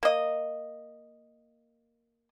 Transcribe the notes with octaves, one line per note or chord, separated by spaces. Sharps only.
A#3 D#5